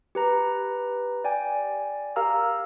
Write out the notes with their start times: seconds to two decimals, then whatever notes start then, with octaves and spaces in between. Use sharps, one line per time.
0.15 G4 B4 A#5
1.24 D5 G5 G#5
2.16 G4 A#4 F5 A#5 E6 F6